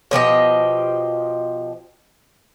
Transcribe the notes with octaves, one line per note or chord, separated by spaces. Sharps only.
B2 F3 G4 D#5